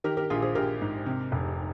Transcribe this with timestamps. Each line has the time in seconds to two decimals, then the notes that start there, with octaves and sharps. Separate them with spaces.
0.04 D#3 G4 A#4
0.17 G4 A#4
0.30 A#1 F4 G#4
0.42 G#4 C5
0.55 A#1 G4 A#4
0.82 G#2
1.06 C3
1.32 F1